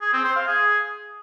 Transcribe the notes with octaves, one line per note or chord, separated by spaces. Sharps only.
G#4
C4
C5
F5
G#4